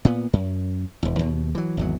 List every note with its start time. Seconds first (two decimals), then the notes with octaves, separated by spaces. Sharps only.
0.05 A#2 B3
0.33 F#2
1.03 E1 E2
1.19 D#2 B2
1.55 E3 F#3
1.77 G#1 E2 F#3